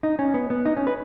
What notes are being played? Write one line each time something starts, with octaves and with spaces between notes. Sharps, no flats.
D#4
C#4
B3
B3
D#4
C#4
B4